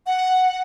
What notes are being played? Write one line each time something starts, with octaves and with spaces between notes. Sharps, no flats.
F#5